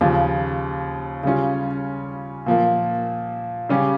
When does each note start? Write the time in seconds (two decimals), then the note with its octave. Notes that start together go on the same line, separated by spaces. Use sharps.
0.01 D#2 C#3 F3
1.23 C#3 G3 C#4 F4
2.46 A#2 F3 A#3
3.69 C#3 G3 C#4 G4